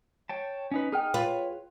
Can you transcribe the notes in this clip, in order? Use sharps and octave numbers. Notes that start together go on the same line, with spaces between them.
C#5 G5 A5
C#4 D#4 B4
D#4 G#4 G5 F6
F4 B4 C#5